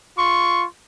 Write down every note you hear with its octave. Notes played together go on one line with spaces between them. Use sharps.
F4 C6 C#6